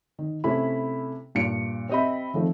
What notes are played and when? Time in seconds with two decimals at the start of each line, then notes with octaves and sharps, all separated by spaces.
0.19 D#3
0.44 C3 A3 C#4 E4 B5
1.35 G2 A#2 C#7 D7
1.89 C4 G4 D#5 E5 B5
2.34 D#3 F3 A3 C4